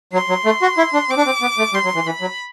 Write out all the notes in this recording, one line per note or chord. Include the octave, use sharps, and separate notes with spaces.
F#3 C6
F#3
A3
F#4
E4
D4
C4 D6
D4
C4
B3
A3
G3 C6
F#3
E3
E3 B5
F#3